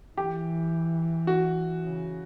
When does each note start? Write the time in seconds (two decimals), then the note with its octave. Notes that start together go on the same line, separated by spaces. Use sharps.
0.17 E3 G4
1.27 F#4
1.82 C#3